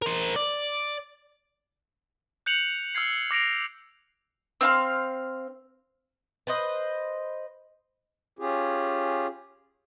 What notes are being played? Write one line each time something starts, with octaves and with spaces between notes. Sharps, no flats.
A#4 C5
D5
F#6 G6 C#7 F7 F#7
E6 F6 G#6 C7
D6 A#6 C7 D7 F7
C4 F5 C6
B4 C5 D#5
C#4 F4 G4 G#4